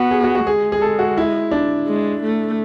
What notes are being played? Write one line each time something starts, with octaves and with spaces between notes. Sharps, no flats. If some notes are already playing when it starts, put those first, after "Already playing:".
Already playing: B3 F#4
G#4
F#4
F#4
G#3 G#4
G#4
A4
F#4
E4
D4
G#3
A3